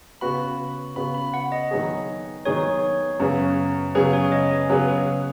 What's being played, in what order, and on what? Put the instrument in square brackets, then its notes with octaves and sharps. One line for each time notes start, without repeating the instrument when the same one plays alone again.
[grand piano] C#3 B3 F#4 [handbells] B5
[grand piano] C#3 B3 F#4 [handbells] B5
[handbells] B5
F#5
D#5
[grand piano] D#3 F#3 B3 G#4
[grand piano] D#3 F#3 B3 G#4 [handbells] C#5
[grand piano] F#2 C#3 F#3 B3 G#4
[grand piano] F#2 C#3 F#3 B3 G#4 [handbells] B4
[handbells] C#5
D#5
G#5
[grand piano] C#3 F#3 B3 G#4
[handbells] B4
B4